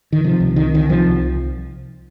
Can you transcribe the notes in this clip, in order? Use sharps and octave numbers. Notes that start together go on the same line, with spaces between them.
D#3
C3 F3
C2
C3 D#3
C2 D#3
C3 F3
C2